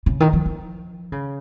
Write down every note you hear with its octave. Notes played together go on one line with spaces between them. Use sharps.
C#3
D#3
F3
F3
C#3